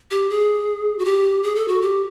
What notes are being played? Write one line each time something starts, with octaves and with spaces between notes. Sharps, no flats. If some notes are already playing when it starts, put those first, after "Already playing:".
G4
G#4
F#4
G4
G#4
A4
F#4
G4